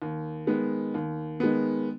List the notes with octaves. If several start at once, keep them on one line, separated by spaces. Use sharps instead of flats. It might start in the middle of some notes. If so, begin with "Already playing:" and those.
D#2
D#3 G#3 B3
D#2
D#3 G#3 B3